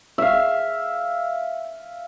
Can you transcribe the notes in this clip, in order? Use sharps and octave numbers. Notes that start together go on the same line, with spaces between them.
E5 F5